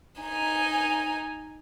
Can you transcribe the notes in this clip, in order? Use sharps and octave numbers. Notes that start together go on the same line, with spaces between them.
D#4 G#5